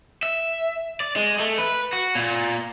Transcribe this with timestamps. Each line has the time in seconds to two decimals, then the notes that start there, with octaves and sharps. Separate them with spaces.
0.23 E5
1.00 D5
1.16 G#3
1.40 A3
1.58 B4
1.93 F#4
2.15 A#2